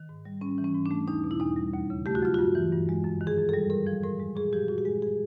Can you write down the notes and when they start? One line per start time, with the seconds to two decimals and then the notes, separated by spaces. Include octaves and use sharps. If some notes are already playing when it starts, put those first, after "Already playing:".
Already playing: D#3
0.09 G#2
0.25 G3
0.41 G#2 C#4
0.58 E3
0.64 C#4
0.75 G#2
0.86 D4
0.91 A3
1.08 E2 D#4
1.24 B2
1.31 E4
1.40 E2 D#4
1.57 G3
1.73 D#2
1.90 C#3
2.06 A3 G4
2.15 F#4
2.23 F#3 F4
2.34 G2 F#4
2.55 E3
2.72 G2
2.89 G#3
3.04 F#2
3.21 D#3
3.27 G#4
3.38 F#2
3.49 A4
3.53 G3
3.70 A2 A#4
3.87 F3
4.03 A2 A#4
4.20 G#3
4.36 A#2 G#4
4.53 F3 G4
4.68 A#2 F#4
4.78 G4
4.85 G#3 G#4
5.02 G#4